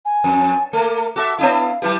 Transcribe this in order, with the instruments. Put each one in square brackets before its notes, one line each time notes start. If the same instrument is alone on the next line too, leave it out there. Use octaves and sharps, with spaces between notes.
[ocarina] G#5
[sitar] F2
[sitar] A3 A#3 [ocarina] A#4
[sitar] F#4 A4 E5 [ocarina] D6
[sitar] B3 D4 E4 [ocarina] F5
[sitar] F#3 E4 G4 [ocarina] B4